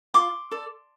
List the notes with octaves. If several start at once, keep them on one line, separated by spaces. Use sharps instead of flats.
F4 C6 D6
A4 D5